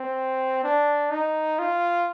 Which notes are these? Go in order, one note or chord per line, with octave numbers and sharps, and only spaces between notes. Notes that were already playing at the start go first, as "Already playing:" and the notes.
Already playing: C4
D4
D#4
F4